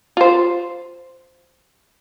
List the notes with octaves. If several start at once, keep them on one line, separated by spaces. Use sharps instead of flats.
F4 C5